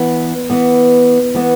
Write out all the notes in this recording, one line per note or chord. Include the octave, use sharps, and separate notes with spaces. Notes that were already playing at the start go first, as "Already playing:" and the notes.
Already playing: E3 B3 B4 D5
E3 B3
E3 B3